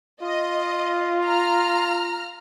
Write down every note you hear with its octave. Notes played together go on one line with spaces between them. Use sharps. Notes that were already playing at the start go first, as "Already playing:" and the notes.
F4 D#5
A#5 F6